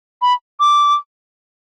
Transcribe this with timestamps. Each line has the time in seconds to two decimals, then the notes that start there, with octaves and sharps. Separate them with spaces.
0.22 B5
0.60 D6